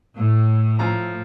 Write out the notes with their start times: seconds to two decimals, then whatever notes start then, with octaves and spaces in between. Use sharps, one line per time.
0.17 A2
0.79 F3 A#5